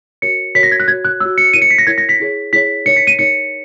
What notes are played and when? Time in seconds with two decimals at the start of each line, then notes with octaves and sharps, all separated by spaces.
0.22 F#4 A#4 C#5 C#7
0.55 F#4 A#4 C#5 B6
0.63 A#6
0.72 G#6
0.80 F#6
0.88 F#4 C#5 G#6
1.05 F#6
1.20 F#4 C#5 E6
1.38 C#7
1.53 E4 A#4 C#5 D#7
1.62 C#7
1.71 B6
1.78 A#6
1.87 E4 A#4 C#5 G#6
1.98 A#6
2.09 B6
2.20 E4 G#4 C#5
2.53 E4 G#4 C#5 B6
2.85 D#4 A#4 C#5 C#7
2.96 B6
3.07 D#7
3.19 D#4 A#4 C#5 C#7